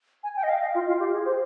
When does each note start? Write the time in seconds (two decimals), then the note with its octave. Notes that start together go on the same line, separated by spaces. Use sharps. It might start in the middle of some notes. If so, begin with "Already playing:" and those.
0.23 G#5
0.36 G5
0.43 D#5
0.49 F5
0.61 D#5
0.74 F4
0.87 F4
0.99 G4
1.13 G#4
1.25 C5